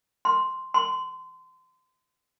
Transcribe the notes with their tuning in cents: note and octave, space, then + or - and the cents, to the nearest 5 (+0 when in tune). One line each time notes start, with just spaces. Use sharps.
C6 +0
C6 -25